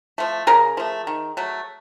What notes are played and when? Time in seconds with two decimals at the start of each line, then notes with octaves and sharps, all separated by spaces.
0.18 F3 A3
0.47 C#3 G#4 A#4
0.77 F3 A3
1.07 D#3
1.37 F#3 A3